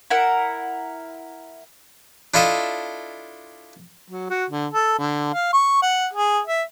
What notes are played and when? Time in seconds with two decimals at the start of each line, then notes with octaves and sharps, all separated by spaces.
0.10 E4 A#4 F#5
2.34 D4 E4 F4 A4 D#5 E5
4.10 F#3
4.30 F#4
4.50 D3
4.73 A4
4.99 D3
5.33 F5
5.53 C#6
5.82 F#5
6.13 G#4
6.47 E5